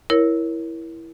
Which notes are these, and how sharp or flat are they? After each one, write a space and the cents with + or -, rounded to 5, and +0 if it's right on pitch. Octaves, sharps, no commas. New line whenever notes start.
E4 +0 A#4 +15 C#5 +0